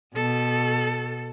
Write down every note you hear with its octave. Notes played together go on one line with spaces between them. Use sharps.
B2 A4